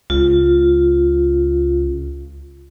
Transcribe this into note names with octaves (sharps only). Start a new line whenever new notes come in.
C#2 F4